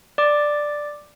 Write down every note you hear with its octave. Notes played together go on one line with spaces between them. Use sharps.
D5 D6